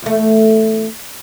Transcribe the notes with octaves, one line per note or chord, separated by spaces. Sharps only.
E2 A3